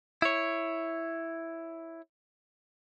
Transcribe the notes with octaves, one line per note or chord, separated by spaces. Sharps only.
E4 C#5